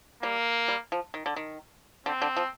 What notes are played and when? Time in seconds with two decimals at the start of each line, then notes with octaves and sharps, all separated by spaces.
0.22 G3 A#3
0.68 G3
0.92 F3
1.14 D#3
1.26 D3
1.36 D#3
2.06 D3 C4
2.22 D3
2.37 F3